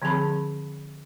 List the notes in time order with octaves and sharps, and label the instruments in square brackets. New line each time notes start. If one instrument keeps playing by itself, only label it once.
[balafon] D3 F3 C4 G#4 A5 B5